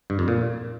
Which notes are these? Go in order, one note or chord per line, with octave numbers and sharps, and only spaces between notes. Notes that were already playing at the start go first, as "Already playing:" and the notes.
G2
F2
A#2